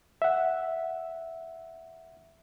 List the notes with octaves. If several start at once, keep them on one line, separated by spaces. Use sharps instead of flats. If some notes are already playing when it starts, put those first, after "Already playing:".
E5 F#5